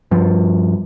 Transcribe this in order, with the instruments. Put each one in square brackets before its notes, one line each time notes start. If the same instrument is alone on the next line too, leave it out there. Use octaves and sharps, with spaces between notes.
[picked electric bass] G2 F3